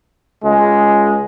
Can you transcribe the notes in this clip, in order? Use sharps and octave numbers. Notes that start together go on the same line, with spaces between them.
C#2 G#3